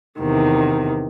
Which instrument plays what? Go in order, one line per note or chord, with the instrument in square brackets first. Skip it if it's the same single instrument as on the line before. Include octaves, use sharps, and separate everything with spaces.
[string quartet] E2 C3 D#3